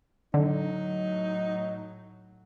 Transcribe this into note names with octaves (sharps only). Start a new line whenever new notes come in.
A2 D3 F#3 D#4